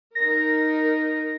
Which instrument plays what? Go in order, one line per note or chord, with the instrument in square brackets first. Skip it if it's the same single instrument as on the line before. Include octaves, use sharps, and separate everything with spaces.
[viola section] D#4 A#4 [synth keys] A#6